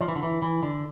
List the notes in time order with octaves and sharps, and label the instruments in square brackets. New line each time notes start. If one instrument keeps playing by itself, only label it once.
[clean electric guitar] F3
E3
D3
E3
E3
D3